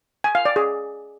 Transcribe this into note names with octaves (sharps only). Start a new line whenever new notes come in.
G#5
F5
D5
G#4